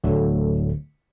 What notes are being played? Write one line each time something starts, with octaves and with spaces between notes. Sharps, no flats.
D1 D3 F#3 A3